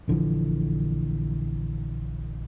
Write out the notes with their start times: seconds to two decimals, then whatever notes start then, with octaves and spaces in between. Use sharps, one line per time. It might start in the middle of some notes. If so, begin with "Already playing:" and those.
0.08 A#1 D3 E3 F3